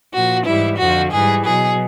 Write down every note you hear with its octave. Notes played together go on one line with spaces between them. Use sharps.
A#2 F3 F#4
G#2 E3 G3 E4
F2 D3 F3 F#4
G#2 E3 G3 G#4
B2 F#3 G#4